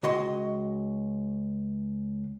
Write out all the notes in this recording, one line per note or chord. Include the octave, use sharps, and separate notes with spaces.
C#2 F#4 D#5 C6